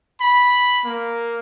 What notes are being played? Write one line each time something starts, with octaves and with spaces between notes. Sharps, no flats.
B5
A#3